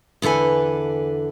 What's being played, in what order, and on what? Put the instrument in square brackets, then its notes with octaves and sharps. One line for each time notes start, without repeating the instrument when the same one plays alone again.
[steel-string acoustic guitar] E2 D3 A4 B4 G#5